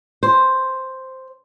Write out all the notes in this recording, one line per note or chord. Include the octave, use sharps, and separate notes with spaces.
C5